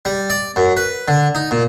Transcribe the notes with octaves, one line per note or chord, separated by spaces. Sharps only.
G3
D5
F#2
B4
D3
D#4
A#2